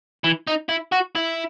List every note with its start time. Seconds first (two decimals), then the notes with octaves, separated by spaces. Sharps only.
0.24 E3
0.47 D#4
0.69 E4
0.92 F#4
1.15 E4